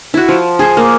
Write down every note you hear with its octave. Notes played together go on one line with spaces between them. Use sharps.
E4 F#4
F3
G#4 C5
A#3